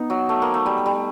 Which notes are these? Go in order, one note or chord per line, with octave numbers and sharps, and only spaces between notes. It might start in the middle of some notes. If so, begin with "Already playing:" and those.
Already playing: B3 D#4
F#3
A3
A#3
A3
G3
G3